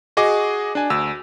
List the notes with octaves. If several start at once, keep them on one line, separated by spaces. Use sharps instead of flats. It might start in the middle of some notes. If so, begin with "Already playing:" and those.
F#4 G#4 D#5 D6
D4 G#5
D2 E6